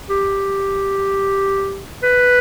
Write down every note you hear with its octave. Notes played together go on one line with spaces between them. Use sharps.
G4
B4